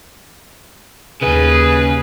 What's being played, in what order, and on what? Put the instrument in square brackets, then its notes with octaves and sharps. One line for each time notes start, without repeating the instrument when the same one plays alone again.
[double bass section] D#2 [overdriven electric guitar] C#3 G#5 [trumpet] G#4 [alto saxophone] B4